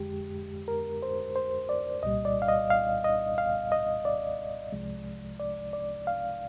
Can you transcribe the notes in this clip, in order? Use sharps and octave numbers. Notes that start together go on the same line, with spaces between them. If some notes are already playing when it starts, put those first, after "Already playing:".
Already playing: F2 D3 G#3 G4
A#4
C5
C5
D5
C2 A#2 G3 D#5
D5
F5
D#5
F5
D#5
F5
D#5
D5
C2 C3 F3 G#3
D5
D5
F5